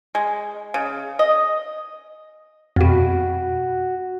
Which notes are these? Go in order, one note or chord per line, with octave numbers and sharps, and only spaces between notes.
G#3
C#3
D#5
F2 B2 F#4